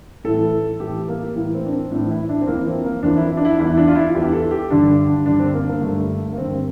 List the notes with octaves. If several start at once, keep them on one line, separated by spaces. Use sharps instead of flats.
A2 E3 A4
A2 E3 G4
A#3
A2 E3 A#3
C4
D4
C4
A2 E3 D4
E4
D4
C4
F2 E3 A#3
C4
A#3
F2 E3 D4
E4
D4
E4
E2 E3 E4
D4
F4
E4
E2 E3 G4
A4
G4
G2 D3 D4
G2 D3 D4
C4
A#3
A#3
G2 D3 A3
A#3
G2 D3 C4